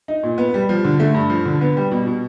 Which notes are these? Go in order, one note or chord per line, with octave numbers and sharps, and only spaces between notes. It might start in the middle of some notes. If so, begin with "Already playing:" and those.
D#4
A#2
B3
G3
F3
D3
A3
G2
F3
D3
B3
G3
B2
B2